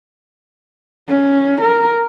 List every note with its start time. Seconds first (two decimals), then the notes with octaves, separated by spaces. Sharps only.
1.08 C#4
1.61 A#4